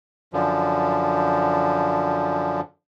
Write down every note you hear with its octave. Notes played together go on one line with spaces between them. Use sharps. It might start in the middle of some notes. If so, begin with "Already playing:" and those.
F#2 D3 F3